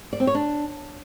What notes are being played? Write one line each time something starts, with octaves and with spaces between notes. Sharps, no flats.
D5
C4
C#5
D4